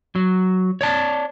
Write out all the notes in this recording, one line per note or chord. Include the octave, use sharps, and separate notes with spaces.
F#3
C#5 D5 A5